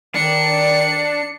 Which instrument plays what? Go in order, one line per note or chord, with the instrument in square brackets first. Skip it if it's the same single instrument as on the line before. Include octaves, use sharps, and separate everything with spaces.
[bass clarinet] D#3 [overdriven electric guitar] D4 [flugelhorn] D5 [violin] C#7